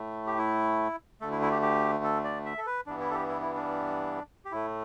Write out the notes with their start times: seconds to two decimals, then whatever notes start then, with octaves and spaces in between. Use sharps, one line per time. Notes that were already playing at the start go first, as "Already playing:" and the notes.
Already playing: A2 A3
0.27 G4
0.38 E4
1.21 D2 D3 A3 A4
1.32 E4
1.42 E4
1.52 G4
1.62 G4
2.04 A4
2.24 D5
2.45 E5
2.58 A4
2.66 B4
2.86 G2 E3 G3 B3 D4
3.00 E4
3.11 A4
3.14 G4
3.28 E4
3.41 E4
3.55 D4
4.45 G4
4.52 A2 A3 E4